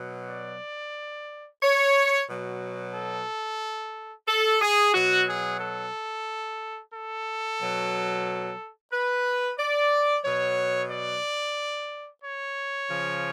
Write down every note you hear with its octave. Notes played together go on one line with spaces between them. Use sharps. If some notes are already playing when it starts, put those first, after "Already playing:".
Already playing: B2 F#3
D5
C#5
B2 F#3
A4
A4
G#4
B2 F#3 F#4
G#4
A4
A4
B2 F#3
B4
D5
B2 F#3 C#5
D5
C#5
C#3 F3